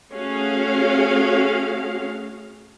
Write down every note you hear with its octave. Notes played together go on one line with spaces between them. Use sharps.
A3 C#4 F#4 G#4 F5